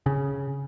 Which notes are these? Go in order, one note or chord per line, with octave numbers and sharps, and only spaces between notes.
C#3